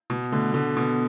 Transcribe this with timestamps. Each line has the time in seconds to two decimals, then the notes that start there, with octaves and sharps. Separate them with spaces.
0.10 B2 B3
0.32 D3 A3
0.54 D3 B3
0.77 B2